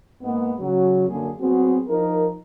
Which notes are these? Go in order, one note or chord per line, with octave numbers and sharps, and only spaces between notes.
G#2 A#3 B3
C#3 F#3
F#2 D3 A#3 G#4
F#3 B3 C4 F#4 G#4
F3 D#4 A#4